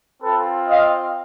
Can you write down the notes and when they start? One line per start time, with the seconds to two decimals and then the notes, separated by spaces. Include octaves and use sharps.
0.22 C4 F4 A4 B4
0.68 D#5 F5